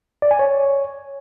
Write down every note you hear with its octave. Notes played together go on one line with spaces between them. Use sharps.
D5
G#5
C#5